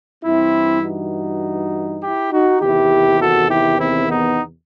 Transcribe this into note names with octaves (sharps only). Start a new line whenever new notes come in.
G2 E3 C4 E4
D#4 F#4
E4 G4
D#4 F#4
E2 C3 D#3 E4 G4
F#4 A4
E4 G4
C4 E4
B3 D#4